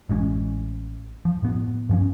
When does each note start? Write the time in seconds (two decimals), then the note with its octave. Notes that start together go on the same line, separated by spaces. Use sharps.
0.09 A1 G#3 A#3 C#4
1.25 F3
1.42 A2 B3
1.89 G2 F3 C#4